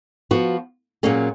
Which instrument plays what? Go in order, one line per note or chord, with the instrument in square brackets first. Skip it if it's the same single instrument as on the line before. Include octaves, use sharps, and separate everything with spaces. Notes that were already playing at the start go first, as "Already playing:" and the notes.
[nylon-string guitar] F3 B3 F#4
A#2 F#3 A#3 C#4 G#4